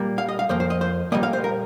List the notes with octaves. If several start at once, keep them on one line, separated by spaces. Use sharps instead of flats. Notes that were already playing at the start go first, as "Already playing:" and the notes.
Already playing: A#2 G3 A#3
F5
D#5
F5
F2 F3 A#3 C5
C5
D#5
C5
A#2 G3 A#3 D#5
F5
C5
A#4